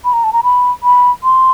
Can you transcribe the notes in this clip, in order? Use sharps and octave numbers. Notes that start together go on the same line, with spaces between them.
B5
A#5
A5
A#5
B5
B5
C6